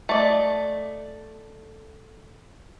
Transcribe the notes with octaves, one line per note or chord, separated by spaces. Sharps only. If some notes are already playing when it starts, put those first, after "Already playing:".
A3 D5 D#5